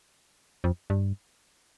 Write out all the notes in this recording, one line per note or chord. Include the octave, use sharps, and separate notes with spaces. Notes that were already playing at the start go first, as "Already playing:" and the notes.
F2
G2